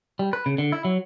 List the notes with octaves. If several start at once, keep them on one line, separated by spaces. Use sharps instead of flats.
G3
B4
C#3
D3
E4
F#3